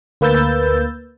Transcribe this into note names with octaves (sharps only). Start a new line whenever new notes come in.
D2 A#3 B4 E6 G6 A6